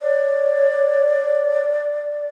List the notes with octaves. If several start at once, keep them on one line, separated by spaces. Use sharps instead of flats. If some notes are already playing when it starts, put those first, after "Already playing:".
C#5 D5